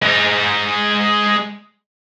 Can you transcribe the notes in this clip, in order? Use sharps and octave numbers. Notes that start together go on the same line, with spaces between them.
G#3 A#5